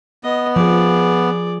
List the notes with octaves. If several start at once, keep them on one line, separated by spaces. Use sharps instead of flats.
B3 D#5
F3 G#4 D5